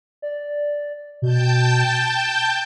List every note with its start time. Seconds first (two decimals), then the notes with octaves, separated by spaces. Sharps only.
0.22 D5
1.22 B2 G5 A5 G6
1.87 A6